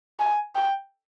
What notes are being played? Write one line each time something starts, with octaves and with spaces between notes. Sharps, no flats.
G#5
G5